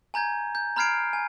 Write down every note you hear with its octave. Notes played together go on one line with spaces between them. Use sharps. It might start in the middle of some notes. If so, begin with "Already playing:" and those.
G#5 A#5 G6 G#6
G6
A#5 B5 F6 G#6 C7 D7
G#5